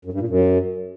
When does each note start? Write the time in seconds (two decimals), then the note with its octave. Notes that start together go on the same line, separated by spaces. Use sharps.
0.05 F#2
0.13 G2
0.20 A#2
0.28 F#2